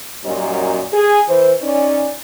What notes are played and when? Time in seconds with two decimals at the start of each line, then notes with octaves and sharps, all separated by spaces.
0.24 F#2 A#2 G3 C#4 D#4 F#4
0.93 G#4
1.28 E3 C5
1.62 C#4 D#4 D5